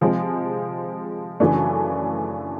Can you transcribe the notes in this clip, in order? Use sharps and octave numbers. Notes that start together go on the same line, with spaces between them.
C3 F3 G#3 C4
F#2 C#3 E3 A3 D4